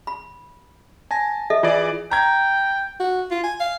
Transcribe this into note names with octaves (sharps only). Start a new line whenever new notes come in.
B5
G#5 A5 A#6
A4 D#5 E5
E3 F4 G#4 D5
G5 A#5 G#6
F#4
F4
G#5
F5